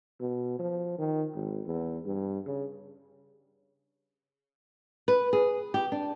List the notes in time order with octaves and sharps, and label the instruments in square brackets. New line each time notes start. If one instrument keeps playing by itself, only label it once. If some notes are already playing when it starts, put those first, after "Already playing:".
[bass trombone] B2
F3
D#3
G#1
E2
G2
C#3
[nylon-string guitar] B4
G#4
G4
D4